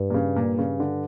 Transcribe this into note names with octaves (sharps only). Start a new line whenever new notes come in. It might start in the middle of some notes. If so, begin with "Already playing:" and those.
Already playing: G2
A#2
C#3
A#2
C#3
D3